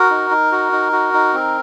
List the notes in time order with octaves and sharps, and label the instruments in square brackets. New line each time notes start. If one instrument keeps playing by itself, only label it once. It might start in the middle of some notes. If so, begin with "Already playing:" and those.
Already playing: [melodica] F#4 A#4
D#4
D#4
F#4
D#4
F#4
D#4
C4